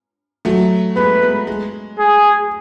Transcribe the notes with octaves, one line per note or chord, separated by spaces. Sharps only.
F#3 A3
G#3 B3 B4
G#3 B3
G#3
G#4